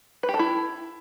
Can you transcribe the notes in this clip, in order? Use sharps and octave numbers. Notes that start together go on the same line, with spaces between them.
B4
G4
A4
E4